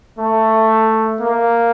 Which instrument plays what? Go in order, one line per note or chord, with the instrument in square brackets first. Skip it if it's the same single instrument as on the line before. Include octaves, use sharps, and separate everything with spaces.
[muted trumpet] A3
A#3